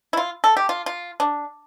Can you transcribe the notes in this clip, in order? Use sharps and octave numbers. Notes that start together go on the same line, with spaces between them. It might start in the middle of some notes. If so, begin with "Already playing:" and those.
E4
F4
A4
G4
F4
F4
D4